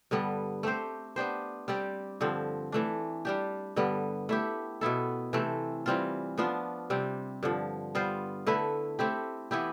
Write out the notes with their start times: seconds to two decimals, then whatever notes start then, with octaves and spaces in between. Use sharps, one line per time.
0.11 G2 D3 G3 B3
0.63 A3 C4 G4 C5
1.16 B3 D4 G4 C5
1.68 G3 C4 G4 D5
2.21 G2 D3 F3 C4
2.72 E3 A3 D4
3.25 G3 D4 G4
3.76 G2 D3 G3 B3
4.29 A3 E4 G4
4.81 B2 B3 E4 A4
5.33 C3 E3 A3 C4
5.86 E3 G3 C4 F4
6.38 F3 B3 D4 F4
6.90 C3 G3 C4
7.43 G2 D3 F3
7.95 G3 B3 F4 C5
8.47 D3 A3 E4 B4
8.99 A3 C4 E4 G4
9.51 E3 B3 E4 G4